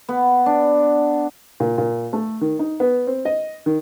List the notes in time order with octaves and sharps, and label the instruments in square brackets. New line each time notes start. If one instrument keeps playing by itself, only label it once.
[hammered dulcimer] B3
D4
[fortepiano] A#2
A#2
A3
D#3
D#4
B3
C4
D#5
D#3